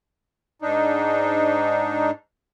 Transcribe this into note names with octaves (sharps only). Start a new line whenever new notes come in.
G#2 D4 D#4